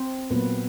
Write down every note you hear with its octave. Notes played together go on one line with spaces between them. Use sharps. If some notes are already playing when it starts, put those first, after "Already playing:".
Already playing: C4 C5
A#2 F#3 A#3 B3 B4